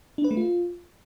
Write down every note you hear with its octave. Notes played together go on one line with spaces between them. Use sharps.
D4
B4
A3
F4